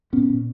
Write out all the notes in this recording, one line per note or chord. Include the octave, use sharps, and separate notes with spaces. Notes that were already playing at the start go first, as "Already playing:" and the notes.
A#2 B3 C#4
A#2